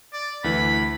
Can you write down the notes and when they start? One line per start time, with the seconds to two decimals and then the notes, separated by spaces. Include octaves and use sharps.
0.13 D5
0.44 D2 E3 B5